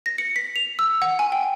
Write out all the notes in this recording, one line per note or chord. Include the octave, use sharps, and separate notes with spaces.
A#6
C#7
B6
F7
E6
F#5
G#5
G5